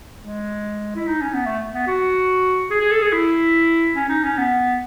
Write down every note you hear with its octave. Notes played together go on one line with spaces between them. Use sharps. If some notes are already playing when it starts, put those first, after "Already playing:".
G#3
E4
D#4
C#4
B3
A3
B3
F#4
G#4
G#4
A4
G#4
E4
C#4
D#4
C#4
B3